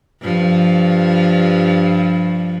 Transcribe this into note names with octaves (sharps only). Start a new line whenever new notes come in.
G2 F3